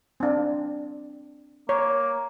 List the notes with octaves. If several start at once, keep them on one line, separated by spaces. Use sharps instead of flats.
C4 D4
A#3 C#5